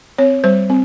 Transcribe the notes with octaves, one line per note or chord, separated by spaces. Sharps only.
C4 C#5
G3 C5
C4